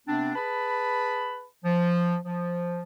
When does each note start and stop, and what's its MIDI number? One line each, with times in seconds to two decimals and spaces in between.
0.07 0.33 48
0.07 0.33 59
0.07 0.33 60
0.07 0.33 62
0.36 1.44 68
0.36 1.44 71
0.36 1.44 81
0.36 1.44 83
1.64 2.16 53
2.25 2.82 53